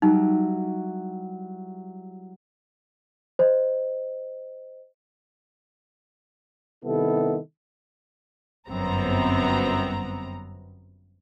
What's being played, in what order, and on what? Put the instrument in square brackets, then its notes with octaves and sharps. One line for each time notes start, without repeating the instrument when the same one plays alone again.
[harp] F#3 G3 E4 [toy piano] D#4
[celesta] C5 D#5
[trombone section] C3 D#3 G3 B3 E4 A4
[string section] G1 F#2 B3 C4 A#5